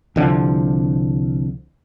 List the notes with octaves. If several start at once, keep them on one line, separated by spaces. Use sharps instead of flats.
C2 D3 F3